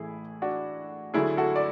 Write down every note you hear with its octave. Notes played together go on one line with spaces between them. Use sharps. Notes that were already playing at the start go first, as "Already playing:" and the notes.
Already playing: A1 A2 E3 A3 E4 G#4
D4 F#4
D2 D3 F#3 A3 E4 G#4
F#4 A4
D5